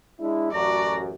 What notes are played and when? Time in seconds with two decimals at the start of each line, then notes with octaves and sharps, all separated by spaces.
0.20 G#3 D4 E4
0.52 A1 F#2 A3 F#4 D5 A#5